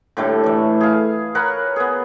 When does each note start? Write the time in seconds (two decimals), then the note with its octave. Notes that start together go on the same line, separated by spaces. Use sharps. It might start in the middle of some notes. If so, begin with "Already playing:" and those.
0.17 A2 D3 G3 A3
0.44 E3 A3
0.81 G#4 F5
1.35 A#4 B4 C#5 F#5
1.76 B3 G#4